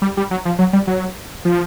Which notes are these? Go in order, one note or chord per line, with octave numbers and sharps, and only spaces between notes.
G3
G3
F#3
F3
F#3
G3
F#3
F3